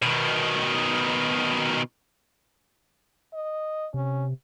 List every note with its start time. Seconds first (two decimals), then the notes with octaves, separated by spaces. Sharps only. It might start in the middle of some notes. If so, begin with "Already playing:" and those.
0.02 B2 D#3
3.33 D#5
3.94 C3 C#4